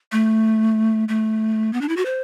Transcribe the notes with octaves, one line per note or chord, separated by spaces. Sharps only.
A3
A3
B3
D4
E4
F#4
C5